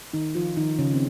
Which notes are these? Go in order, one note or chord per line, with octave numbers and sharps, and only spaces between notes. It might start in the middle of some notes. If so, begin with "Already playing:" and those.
D#3 D#4
F3 F4
D#3 D#4
C#3 C#4
C4